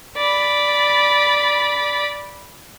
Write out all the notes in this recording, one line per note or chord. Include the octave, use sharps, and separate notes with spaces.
D5 B5